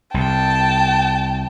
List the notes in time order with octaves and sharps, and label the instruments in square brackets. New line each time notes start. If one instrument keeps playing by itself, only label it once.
[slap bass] C2 [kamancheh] G5 A5